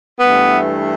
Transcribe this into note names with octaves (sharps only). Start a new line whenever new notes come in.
G2 E3 A3 B3